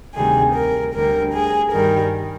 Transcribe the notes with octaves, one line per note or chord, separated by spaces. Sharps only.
D2 C3 D#3 G3 G#4
A#4
D2 D3 G3 A#4
G#4
G2 D#3 G3 A#4